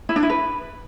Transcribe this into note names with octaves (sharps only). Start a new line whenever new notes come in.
E4
D4
E4
B4